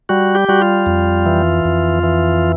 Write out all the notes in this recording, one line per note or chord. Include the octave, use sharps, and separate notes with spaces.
G3 F#4
G4
G3 F#4
F4
F2
E3
F2
E3